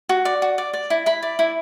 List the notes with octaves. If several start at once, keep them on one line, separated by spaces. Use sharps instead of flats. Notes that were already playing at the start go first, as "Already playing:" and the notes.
F#4
D5
F#4
D5
D5
E4
E4 B5
D5
E4